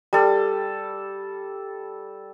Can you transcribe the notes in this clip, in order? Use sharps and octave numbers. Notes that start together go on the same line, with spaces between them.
G3 A4